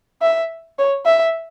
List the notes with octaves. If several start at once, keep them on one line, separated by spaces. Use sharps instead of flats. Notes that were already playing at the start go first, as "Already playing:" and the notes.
E5
C#5
E5